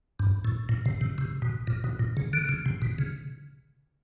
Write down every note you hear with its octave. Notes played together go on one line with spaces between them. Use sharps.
G2
A2
A#2
C3
C3
C3
B2
A#2
B2
A#2
C#3
D3
C#3
C3
B2
C#3